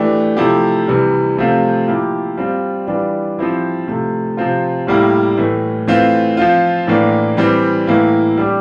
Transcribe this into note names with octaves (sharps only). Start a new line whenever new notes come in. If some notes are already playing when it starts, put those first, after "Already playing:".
Already playing: E3 A3 D4 G4
C3 F3 A3 E4 G4
C3 E3 G3
C3 F3 A3 C4 F4
F3 A#3 E4 G4
G3 C4 F4
E3 G3 D4 F4
F3 C4 E4 G4
C3 F3 A3
C3 F3 C4 F4
A2 G3 A#3 E4 G4
A2 E3 A3
E3 A3 C4 F4
F3 C4 F4
A2 E3 A#3 D4
E3 G3 C4 G4
A2 E3 A#3 E4
G3 D4 G4